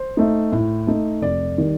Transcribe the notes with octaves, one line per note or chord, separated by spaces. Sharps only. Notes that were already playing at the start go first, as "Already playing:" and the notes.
Already playing: C5
A3 D#4
A2
A3 D#4
F1 D5
D#3 G3